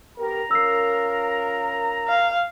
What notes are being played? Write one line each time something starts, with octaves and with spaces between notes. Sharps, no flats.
B3 G4 A#4 A#5
C#4 F4 A#4 E6 C7
F5